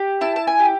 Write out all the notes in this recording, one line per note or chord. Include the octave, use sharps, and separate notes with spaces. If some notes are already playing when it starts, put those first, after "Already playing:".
Already playing: G4
E4 A5
A5
G#5
G4